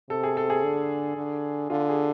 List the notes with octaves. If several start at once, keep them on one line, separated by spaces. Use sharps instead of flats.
C3 A4
G#4
A4
G#4
D3
D3
D3 F4
G#4